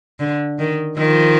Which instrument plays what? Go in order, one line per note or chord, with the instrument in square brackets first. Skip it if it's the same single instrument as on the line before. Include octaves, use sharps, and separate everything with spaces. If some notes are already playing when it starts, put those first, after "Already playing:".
[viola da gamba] D3
D#3
D#3 F3